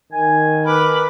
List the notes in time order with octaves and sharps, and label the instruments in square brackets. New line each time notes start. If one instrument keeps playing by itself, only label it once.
[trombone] D#3 [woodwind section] G#5
[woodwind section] A#4 [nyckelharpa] B4 D6 [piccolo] B5